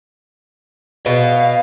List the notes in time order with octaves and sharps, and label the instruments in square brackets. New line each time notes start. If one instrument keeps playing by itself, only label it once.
[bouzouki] B2 [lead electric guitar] F5